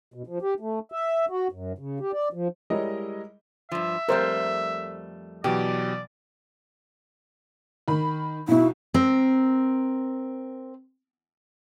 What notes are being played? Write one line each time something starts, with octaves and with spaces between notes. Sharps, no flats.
B2
F3
G4
A3
E5
F#4
F#2
C#3
G4
D5
F3
G3 G#3 E4 A#4 C#5 D#5
G2 F3 E5
F2 G3 A3 A#4 C5
B2 E3 F#3 G4 D5
D#3 B5
B1 B2 E4
C4 A#4